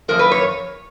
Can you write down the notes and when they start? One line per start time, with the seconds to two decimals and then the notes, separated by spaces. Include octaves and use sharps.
0.08 F#2 F3 A#3 A#4
0.19 B4
0.32 C#5